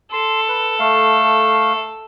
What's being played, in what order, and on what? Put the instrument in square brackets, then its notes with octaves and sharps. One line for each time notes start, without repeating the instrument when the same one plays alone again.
[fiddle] A4 [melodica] C6
[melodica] B4
A3 F5